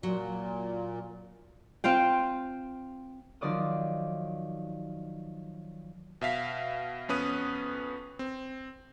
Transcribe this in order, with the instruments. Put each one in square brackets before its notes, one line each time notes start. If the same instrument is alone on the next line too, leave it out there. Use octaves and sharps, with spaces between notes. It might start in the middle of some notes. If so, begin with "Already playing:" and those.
[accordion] A#2 [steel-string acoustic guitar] F#3
[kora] C4 F4 F5 G5
[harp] D#3 F3 F#3 D5 D6 D#6
[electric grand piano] B2 E5 F5 B6
F2 B3 C#4 B4 D#6 D#7
C4